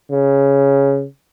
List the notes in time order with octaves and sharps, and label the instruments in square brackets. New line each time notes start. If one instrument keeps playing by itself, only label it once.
[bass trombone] C#3